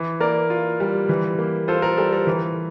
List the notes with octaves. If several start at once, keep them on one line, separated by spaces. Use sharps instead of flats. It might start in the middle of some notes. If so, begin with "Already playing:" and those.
Already playing: E3
A#3 A#4 D5
F4
G3
E3
A#3
F4 A4 C5
A#4
G3 A4
A#4
E3